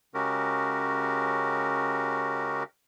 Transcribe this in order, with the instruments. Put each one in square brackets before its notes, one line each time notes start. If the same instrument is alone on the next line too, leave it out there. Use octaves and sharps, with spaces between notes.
[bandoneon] C#3 G#3 C#4 F#4 G4 A#4